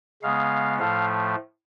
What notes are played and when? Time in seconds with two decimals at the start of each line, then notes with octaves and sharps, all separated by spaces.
0.22 C#3 G#3 B3 F5
0.79 A2 F3 A3 F5